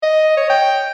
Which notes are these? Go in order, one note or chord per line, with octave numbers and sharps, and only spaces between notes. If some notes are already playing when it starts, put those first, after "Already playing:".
D#5
C#5
G5